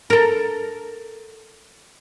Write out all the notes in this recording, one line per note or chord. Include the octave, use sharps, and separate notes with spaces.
A4 A#4